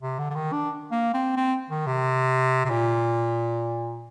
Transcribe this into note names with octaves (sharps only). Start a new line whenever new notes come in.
C3
D3
D3
D#3
D4
A#3
C4
C4
D#3
C3
C3
A#2